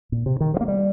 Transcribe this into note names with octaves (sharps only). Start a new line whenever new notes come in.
A#2
C3
D#3
F3
A#3
G3